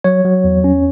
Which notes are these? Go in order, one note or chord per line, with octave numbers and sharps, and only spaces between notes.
F#3 C#5
F#3
E2
C#4